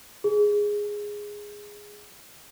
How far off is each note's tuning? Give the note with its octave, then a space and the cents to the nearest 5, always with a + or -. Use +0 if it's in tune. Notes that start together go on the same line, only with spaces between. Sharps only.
G#4 -5